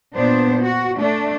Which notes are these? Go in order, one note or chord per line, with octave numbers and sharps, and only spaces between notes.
A#2 B3 D4 C5
F#4
A3 D4